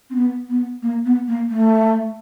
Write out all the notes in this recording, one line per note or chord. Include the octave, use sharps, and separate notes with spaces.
C4
B3
B3
A#3
B3
A#3
A3